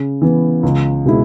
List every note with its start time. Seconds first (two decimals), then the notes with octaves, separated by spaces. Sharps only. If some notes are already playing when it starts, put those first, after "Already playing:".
Already playing: C#3
0.22 E3 B3
0.63 C#2
1.05 B2 G#3 E4